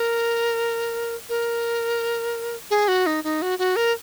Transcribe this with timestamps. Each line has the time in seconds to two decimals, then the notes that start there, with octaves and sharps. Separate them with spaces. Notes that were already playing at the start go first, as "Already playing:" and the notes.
Already playing: A#4
1.29 A#4
2.71 G#4
2.88 F#4
3.06 D#4
3.24 D#4
3.42 F#4
3.59 F#4
3.76 A#4